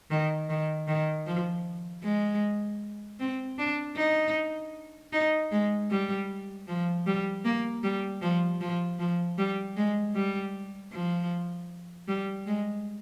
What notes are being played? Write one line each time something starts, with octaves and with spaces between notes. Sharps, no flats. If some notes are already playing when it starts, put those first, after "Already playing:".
D#3
D#3
D#3
F3
G#3
C4
D4
D#4
D#4
G#3
G3
F3
G3
A#3
G3
F3
F3
F3
G3
G#3
G3
F3
G3
G#3